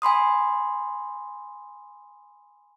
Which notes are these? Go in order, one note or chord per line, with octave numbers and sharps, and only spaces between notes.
G#5 B5 C6 D#6